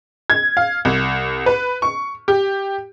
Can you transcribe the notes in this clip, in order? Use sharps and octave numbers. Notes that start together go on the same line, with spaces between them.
G#6
F5
C2
B4
C#6
G4